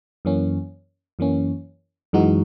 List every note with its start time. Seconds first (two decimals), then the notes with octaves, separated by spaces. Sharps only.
0.25 F#2 E3 A#3 C#4
1.19 F#2 E3 A#3 C#4
2.13 F#2 E3 G#3 D#4 F#4